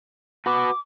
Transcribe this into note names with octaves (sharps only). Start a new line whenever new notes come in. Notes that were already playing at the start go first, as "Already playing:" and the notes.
F#4 B4 D6